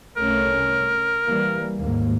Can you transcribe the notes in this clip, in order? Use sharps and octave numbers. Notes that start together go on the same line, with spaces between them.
C2 A3 C#4 A#4
E3 G3 A#3
D#2 G#2 A#3